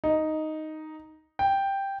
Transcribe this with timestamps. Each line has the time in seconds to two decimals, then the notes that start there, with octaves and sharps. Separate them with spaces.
0.04 D#4
1.39 G5